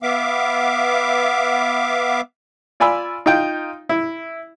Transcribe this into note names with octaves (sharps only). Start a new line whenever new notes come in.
B3 E5 F5 D6
F4 D5 G#5 B5 E6
D#4 F4 G5
E4